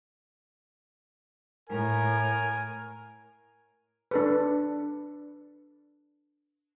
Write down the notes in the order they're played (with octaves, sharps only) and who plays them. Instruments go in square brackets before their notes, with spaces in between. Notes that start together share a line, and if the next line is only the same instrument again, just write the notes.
[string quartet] A2 [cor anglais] A#4 [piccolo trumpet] G#5
[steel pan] D4 A4 B4